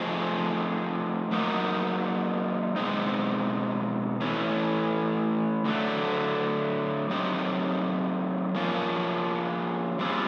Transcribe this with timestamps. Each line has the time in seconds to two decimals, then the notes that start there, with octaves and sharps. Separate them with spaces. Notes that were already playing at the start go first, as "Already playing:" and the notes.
Already playing: F3 A3 C4 D#4 G#4
1.31 F#3 A#3 D#4
2.76 B2 G#3 C4 D#4
4.21 E3 A3 C#4
5.65 D3 F#3 A3
7.10 F#3 A3 C4 D#4 G4
8.55 F3 A#3 C#4 F4
9.99 G3 C4 F4 G#4